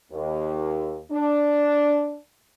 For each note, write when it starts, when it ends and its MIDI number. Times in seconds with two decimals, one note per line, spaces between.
0.12 1.00 39
1.12 2.18 62